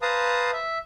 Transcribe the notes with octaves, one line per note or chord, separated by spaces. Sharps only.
B4 C5 F5 A5 A#5 D#6
E5